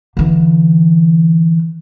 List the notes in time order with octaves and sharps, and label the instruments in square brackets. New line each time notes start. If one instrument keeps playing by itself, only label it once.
[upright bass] D3 E3